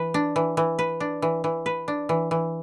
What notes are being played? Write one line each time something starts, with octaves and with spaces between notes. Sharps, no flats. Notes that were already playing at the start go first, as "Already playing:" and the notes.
Already playing: E3 B4
D4
E3
E3
B4
D4
E3
E3
B4
D4
E3
E3